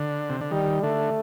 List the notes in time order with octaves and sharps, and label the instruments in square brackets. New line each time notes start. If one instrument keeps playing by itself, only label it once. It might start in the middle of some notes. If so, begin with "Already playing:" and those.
Already playing: [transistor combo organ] D3
C3
D3
[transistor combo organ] D#3 [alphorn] G3
[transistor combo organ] D3 [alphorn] A3